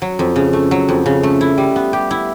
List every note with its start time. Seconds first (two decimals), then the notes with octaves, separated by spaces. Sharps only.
0.02 F#3
0.19 F2
0.36 C#3
0.53 A3
0.71 F#3
0.89 F2
1.06 C#3
1.23 A3
1.41 E4
1.58 G3
1.76 B3
1.93 G4
2.11 E4